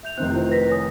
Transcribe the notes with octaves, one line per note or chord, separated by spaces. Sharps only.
E5 G6 F7
F1 D#3 C4 F#6
E4 F4 C5
B4 A#6 B6
C#5 G#5 D#6